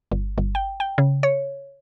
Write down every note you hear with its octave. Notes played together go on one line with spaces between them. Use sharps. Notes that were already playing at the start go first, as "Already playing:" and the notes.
G1
G1
G5
G5
C#3
C#5